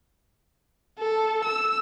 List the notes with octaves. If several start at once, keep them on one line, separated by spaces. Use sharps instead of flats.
A4
E6